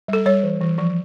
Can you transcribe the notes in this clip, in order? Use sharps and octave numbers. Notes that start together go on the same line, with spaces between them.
G3 A4
G3 C#5
E3
E3
F3